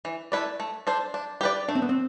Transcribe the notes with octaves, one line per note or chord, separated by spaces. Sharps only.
E3
A3 E4 B4 D5
A3
D4 A4 C5
D4
G4 B4 D5
A3 D4
C4
B3
C4